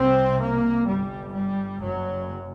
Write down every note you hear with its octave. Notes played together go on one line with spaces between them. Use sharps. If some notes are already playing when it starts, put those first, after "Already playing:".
Already playing: C2 C3 C4
A#3
G1 G2 G3
G3
F#1 F#2 F#3